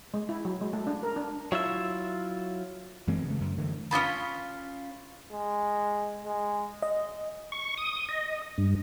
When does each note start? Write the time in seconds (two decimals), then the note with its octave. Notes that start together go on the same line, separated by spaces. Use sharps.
0.14 G#3
0.29 E4
0.45 F#3
0.61 G#3
0.73 A3
0.87 D4
1.03 A#4
1.16 D4
1.52 F#3 E4 F4 E5
3.07 F#2 E3 G#3 C4
3.25 C#3 A3
3.40 F#2
3.58 D3 E3 A3
3.91 C#4 D4 F4 B5
5.32 G#3
6.25 G#3
6.82 D#5
7.52 C#6
7.78 D#6
8.09 D#5
8.58 G2